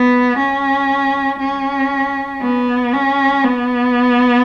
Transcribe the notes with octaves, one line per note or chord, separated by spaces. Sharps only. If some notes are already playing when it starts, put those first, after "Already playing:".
Already playing: B3
C#4
C#4
B3
C#4
B3